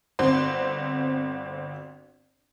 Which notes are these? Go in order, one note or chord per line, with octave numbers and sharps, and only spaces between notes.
G1 C4 F#4 C6